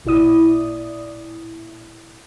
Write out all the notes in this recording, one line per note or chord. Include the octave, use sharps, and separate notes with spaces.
A1 A#2 E4 D5 D#6